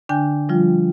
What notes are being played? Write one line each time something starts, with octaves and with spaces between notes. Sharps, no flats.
D3 D4 G5 G#5 G6
F3 G3 F4